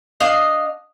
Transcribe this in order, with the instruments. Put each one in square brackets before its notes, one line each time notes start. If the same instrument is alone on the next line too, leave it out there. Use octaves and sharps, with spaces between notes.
[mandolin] D4 D#5 F5 D#6